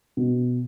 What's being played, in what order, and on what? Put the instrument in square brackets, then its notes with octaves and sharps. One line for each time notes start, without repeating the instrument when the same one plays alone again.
[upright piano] B2